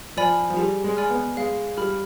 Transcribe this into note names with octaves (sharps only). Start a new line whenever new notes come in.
F3 D5 G#5 B5 F6
F3
G3 G#4
G#3
D5 G#5 B5 F6
B3
G#3 F5
G3 B5 F6